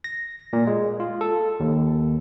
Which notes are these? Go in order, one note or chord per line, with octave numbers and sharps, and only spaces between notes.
A#6
A#2
G#3
F4
A4
D#2